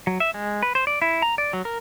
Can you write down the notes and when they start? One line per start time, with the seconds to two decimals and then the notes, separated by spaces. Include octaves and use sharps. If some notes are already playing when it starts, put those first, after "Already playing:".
0.07 F#3
0.20 E5
0.34 G#3
0.63 B4
0.75 C5
0.87 D5
1.02 E4
1.22 A#5
1.38 D5
1.53 F#3
1.65 A#4